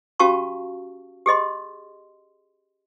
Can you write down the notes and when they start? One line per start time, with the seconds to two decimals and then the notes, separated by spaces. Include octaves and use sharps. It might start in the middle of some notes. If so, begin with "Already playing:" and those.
0.19 C#4 F#4 G4 F5 A5 C#6
1.26 G4 G#4 D#5 C6